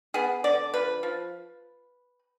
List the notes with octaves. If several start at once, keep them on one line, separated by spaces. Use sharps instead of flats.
B3 G#4
D3 D5
F3 B4
F3